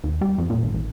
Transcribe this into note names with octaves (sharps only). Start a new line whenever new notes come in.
D#2
G3
F2
A#2
G#1
A1